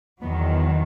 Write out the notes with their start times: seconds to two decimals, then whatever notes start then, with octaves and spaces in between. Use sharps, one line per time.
0.21 E2 D#3 F#3 B3